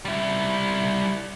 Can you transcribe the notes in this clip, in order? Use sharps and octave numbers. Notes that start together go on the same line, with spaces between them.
G3 E4